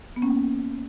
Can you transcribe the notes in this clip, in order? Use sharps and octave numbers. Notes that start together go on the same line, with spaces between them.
B3
A#3 C#4